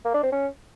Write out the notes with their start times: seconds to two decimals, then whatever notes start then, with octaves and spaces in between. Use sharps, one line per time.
0.05 A#3
0.14 D4
0.23 C4
0.32 C#4